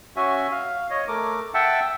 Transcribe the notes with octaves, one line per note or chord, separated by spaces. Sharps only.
C#4 F#4 E5 G#5
F5
C#5 D#5
A3 A#4 D6
E5 F#5 G5 A5 E6